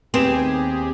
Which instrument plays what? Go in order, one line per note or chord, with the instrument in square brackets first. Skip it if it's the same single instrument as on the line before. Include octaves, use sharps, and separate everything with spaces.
[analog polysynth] D#2 G4 G#4 [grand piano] B3 B4 E7 [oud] C4